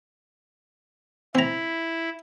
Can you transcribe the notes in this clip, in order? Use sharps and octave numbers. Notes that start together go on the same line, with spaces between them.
C4 E4 A#5